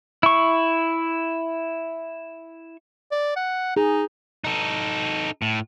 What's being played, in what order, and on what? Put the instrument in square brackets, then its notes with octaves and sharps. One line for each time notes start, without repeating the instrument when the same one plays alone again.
[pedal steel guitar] E4 C#6
[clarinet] D5
F#5
[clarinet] D#4 [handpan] G#4
[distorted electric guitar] D#4 A4
A2